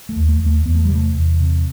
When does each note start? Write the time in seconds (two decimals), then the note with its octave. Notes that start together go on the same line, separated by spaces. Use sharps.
0.09 A3
0.16 D#2
0.29 A3
0.40 D#2
0.46 A3
0.65 E2 B3
0.75 A3
0.85 G3
0.90 C3 A3
1.15 E2
1.41 C3